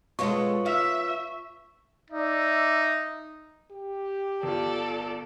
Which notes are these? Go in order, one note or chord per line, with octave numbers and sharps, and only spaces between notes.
B2 G#3 F4 A4 B4 C#5 C#6
E5 F5
D#4 D5 E5
G4
G1 F4 A4 D5